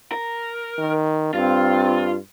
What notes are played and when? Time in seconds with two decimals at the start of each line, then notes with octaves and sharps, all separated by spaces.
0.12 A#4
0.78 D#3
1.34 G2 C4 F4